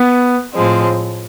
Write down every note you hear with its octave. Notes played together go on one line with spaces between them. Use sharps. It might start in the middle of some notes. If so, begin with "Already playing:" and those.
Already playing: B3
A2 F3 G#3 C4